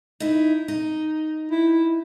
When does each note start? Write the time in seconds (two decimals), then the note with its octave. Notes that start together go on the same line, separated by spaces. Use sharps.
0.20 D#4 E4
0.68 D#4
1.51 E4